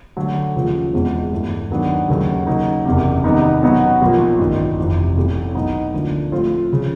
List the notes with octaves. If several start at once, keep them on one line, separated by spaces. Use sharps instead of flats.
D3 F#3 A3
D#2 C#3 F3 A3
E2 B2 G#3 C4
G2 E3 A3
D#2 D#3 F#3 B3 D4
D#2 C#3 F#3 A3
C#3 F#3 A#3 D#4
F#1 E2 C3
C3 D#3 G3 B3 D#4
B2 F#3 B3 D#4 F#4
B1 A#2 F3 A#3
A1 G2 D#3
F1 F2 C3 E3
B1 A2 E3 A3
B2 F#3 B3 D#4 F#4
D2 D3 F3 A#3 D4
A2 F3 A3 C4 F4
C#3 F3